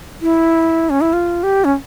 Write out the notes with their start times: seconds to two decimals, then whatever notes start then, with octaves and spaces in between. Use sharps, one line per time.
0.22 E4
0.90 C#4
1.01 E4
1.13 F4
1.43 G4
1.65 C#4